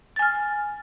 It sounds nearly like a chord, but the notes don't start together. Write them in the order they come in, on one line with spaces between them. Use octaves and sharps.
A6 G#5 F6